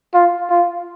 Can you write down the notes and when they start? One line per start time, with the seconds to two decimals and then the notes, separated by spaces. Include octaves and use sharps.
0.14 F4
0.50 F4